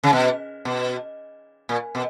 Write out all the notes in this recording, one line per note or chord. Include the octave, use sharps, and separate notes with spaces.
C#3
B2
B2
A#2
B2